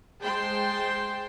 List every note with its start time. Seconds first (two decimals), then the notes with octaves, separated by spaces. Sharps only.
0.22 G#3 C5 G5 A5 C6